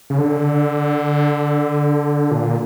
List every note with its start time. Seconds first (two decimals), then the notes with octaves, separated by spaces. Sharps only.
0.10 C#3
0.18 D3
2.31 A#2